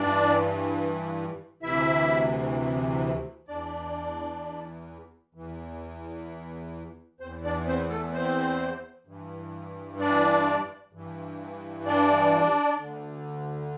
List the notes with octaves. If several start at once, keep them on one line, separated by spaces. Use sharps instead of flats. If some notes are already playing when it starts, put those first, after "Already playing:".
Already playing: G2 E3 D4 D5
D2 C3 E3 E4 E5
E2 E3 D4 D5
E2 E3
E2 E3 C4 C5
D4 D5
C4 C5
A3 A4
C4 C5
G2 E3
D4 D5
G2 E3
D4 D5
D2 D3